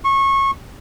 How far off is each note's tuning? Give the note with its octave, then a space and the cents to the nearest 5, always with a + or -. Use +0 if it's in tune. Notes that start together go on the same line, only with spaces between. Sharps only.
C#6 -25